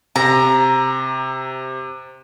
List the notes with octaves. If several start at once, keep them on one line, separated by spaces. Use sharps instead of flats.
C3 A#5